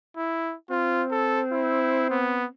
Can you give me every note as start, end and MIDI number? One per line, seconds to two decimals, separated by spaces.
0.17 0.54 64
0.70 2.53 60
0.70 1.03 65
1.11 1.41 69
1.51 2.07 64
2.10 2.45 59